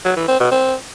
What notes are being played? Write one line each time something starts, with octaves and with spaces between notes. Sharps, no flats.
F#3
E3
C4
B2
C4